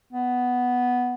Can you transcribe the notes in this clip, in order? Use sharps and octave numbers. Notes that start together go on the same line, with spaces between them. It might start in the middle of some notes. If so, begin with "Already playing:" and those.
B3